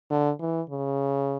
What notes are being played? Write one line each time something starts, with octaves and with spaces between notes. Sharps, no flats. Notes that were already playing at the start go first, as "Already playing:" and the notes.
D3
E3
C#3